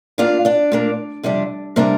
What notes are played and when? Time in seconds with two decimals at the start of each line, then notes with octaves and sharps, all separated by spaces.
0.18 A#2 A#3 D4 F4 F5
0.45 D4 D5
0.72 A#2 A#3 D4
1.23 F2 C3 G3 D4
1.76 C3 G3 A#3 D4 A#4